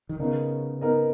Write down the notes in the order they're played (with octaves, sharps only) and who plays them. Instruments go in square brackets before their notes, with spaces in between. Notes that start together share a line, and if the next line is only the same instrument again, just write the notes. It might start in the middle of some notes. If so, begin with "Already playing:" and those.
[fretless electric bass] D#3
[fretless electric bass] C#3 [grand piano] B3 D#4 A#4 D#5
[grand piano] B3 D#4 A#4 D#5